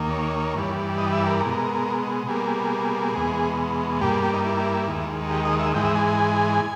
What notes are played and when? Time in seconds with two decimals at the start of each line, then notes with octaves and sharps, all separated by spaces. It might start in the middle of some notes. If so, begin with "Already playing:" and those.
Already playing: D#2 D#3 A#3
0.11 C#5
0.55 G2 E3 G3
0.98 D#5
1.13 E5
1.26 A#4
1.41 B2 G#3
2.27 B2 G3 A#3 G#4
3.15 E2 B2 G#3
4.01 G2 G3 A#3 G4
4.11 G#4
4.23 G4
4.34 D#4
4.45 E4
4.88 D#2 D#3 G#3
5.31 G4
5.45 D#5
5.60 E5
5.74 G#2 E3 G#3 G5
5.85 E5
5.95 G#5
6.07 G#5